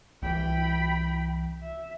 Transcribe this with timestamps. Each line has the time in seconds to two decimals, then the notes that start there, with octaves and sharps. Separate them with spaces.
0.22 C2 E3 G5 B5
1.62 E5